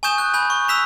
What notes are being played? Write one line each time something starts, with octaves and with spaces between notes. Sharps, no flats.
G#5 C#6 D#6 G6 E7
F#6 G6
G#5 B5 G6
C#6
E6 F#6 B6 E7 F7